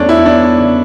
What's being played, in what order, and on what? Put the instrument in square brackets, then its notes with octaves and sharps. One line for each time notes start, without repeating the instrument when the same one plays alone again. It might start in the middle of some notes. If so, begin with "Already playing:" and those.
Already playing: [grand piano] E2 A3 [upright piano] C#4 D4
[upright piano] E4
[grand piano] B3 [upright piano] D4
[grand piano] C#3